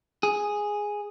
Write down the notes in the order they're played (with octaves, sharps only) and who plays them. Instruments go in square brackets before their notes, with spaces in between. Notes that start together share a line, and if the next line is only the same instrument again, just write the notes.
[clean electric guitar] G#4